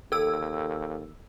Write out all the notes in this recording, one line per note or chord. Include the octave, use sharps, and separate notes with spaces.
D#2 A4 E6